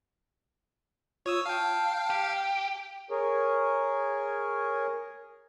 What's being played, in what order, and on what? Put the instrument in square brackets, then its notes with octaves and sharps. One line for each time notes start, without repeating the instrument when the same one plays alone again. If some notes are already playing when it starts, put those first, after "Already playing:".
[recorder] F4 [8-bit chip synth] C#5 D#6 E6
[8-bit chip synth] F5 G5 [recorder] A5
[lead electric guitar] G4
[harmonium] G#4 A#4 C#5